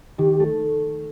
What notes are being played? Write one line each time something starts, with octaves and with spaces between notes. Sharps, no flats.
D#3 G4
A3